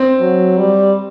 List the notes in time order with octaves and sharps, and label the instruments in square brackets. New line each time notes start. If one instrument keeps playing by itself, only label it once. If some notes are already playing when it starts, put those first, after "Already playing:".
Already playing: [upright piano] C4
[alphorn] F#3
G3